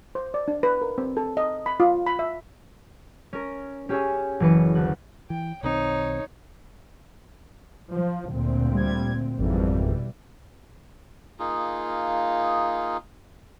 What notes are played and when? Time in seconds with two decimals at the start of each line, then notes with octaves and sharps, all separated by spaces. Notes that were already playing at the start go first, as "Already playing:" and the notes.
0.15 C5
0.34 D5
0.48 D4
0.63 B4
0.82 A#4
0.98 C4
1.17 A4
1.37 D#5
1.66 B5
1.80 F4
2.07 B5
2.19 E5
3.33 C#4 A#4
3.89 C#4 G4 G#4 C#5 E5 G#5
4.40 F#1 E3 B4 C#7
4.75 D2 F#6
5.30 E3 G5
5.63 B1 D#3 C4 D#4 C#5
7.90 F3
8.31 D2 A#2 C4
8.73 G3 G#6
9.38 G#1 F2 B2 E3 G3
11.39 A#3 D#4 F4 G#4